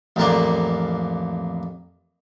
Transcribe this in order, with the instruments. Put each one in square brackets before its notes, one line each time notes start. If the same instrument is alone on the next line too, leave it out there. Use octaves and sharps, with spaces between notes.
[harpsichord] A1 F2 A#3 D4